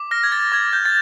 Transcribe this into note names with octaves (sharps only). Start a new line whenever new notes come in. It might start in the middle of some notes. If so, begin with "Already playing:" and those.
Already playing: D6
F6 A#6
G#6
A6
D6 G#6
G6
A6